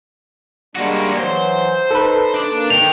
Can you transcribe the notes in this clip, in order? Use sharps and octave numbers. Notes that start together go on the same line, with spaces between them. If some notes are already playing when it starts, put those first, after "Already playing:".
G3 G#3 A#3 D4 F#4
E3 F#3 C5
D#4 A4 B4
D4
A#3
D#3 G5 F7